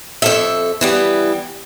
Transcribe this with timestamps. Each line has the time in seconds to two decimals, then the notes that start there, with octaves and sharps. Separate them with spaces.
0.22 F2 A4 E5
0.81 E3 G3 B3